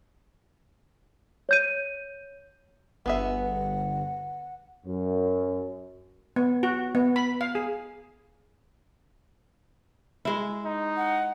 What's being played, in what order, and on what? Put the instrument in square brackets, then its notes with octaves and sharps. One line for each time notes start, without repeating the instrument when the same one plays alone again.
[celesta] C#5 G6 D#7
[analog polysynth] G1 [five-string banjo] B3 G#4 E5 [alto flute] F#5
[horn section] F#2
[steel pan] B3
F#4
B3
B5
F5
G#4
[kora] G#3 E4
[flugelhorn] D#4
[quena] F#5